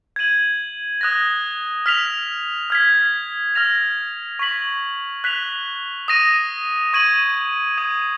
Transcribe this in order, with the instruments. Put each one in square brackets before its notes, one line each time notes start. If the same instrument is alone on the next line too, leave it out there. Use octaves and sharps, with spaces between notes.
[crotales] G#6 D#7 F#7
D#6 F#6 A#6
F6 B6 F7
F6 G#6 B6
F6 A#6 F7
C#6 G#6 B6 F#7
F#6 B6 F7
D#6 A#6 D#7
C#6 G#6 D#7 F#7
D#6 G#6 D#7